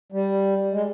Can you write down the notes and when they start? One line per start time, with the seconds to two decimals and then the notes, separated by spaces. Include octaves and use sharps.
0.12 G3
0.72 G#3